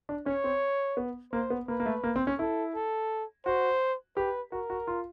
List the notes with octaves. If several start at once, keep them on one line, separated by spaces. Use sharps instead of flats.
D4
C#4 C#5
C4
B3
A#3 C5
B3
A#3 B4
A#3
A3
A#3
C4
C#4
E4 A4
A4
F#4 C5
G4 B4
F#4 A#4
F#4
F4